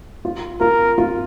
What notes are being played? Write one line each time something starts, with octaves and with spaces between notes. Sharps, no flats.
F4
F4 A#4
F4